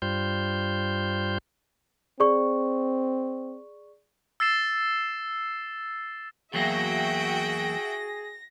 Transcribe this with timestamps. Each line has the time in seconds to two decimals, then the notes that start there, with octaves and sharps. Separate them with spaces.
0.02 G2 G3 F4 C5 G6
2.20 C4 G#4 D5 C#6
4.40 E6 A6 C7 E7
6.54 E2 F#3 A#3 F#4 G#4 E5 G5 A#6